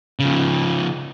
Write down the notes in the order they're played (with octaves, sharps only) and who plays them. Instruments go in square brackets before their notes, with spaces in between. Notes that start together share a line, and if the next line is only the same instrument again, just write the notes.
[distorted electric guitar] C#3 F3